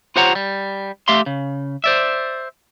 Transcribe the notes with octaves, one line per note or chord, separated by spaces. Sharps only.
F4 G4 C5 C#5 F#5 A#5
G3
A3 G4 E5 F5 C6
C#3
C5 D5 E5